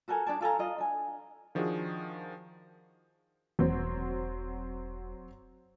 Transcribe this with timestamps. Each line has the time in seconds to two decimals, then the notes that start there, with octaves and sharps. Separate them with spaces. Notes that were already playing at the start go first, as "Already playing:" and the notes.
0.08 F#4 A4 A#4 G#5
0.26 D4 G#4 D5 A5
0.41 F4 A4 G#5 A#5
0.59 F4 D#5
0.78 D4 G#5
1.55 D#3 F3 D4 F#4 G#4
3.59 E1 F#3 C4